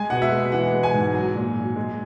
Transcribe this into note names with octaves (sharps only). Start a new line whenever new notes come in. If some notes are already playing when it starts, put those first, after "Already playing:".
Already playing: G#3 G#5
B2 F#5
E5
G#3
E3 F#5
G#3
G#5
G#2
F#3
A#2
F#3
G#3